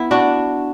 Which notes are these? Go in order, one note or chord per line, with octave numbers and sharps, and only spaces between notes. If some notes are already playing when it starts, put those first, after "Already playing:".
Already playing: B3 E4
D4 F#4